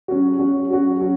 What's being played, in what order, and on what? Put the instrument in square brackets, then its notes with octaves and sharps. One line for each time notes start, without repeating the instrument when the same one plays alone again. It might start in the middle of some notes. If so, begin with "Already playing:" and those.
[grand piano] F#3 C#4 F#4
F#3 C#4 F#4
F#3 C#4 F#4
F#3 C#4 F#4